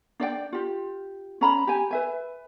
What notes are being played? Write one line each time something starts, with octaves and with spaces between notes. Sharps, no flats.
D4 D5 E5 G5
F4 G4
C#4 A#5 B5
G4 G#5
B4 E5 G#5